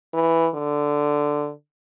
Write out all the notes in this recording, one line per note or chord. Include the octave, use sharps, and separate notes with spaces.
E3
D3